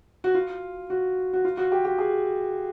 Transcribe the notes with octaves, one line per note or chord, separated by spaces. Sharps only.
F#4
F4
F#4
F#4
F4
F#4
G4
G4
G#4